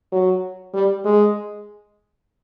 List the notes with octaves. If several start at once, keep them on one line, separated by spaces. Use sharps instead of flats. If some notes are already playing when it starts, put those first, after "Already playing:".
F#3
G3
G#3